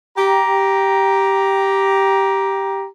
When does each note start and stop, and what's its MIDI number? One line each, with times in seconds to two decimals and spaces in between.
0.17 2.86 67
0.17 2.86 82